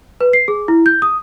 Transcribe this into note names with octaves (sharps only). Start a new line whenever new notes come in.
B4
C7
G#4
E4
G6
D#6